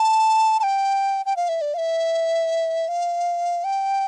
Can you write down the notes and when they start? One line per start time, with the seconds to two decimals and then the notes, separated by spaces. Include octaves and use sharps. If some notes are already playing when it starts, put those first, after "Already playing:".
Already playing: A5
0.60 A5
0.63 G5
1.26 G5
1.36 F5
1.49 E5
1.61 D5
1.74 F5
1.78 E5
2.88 F5
3.64 G5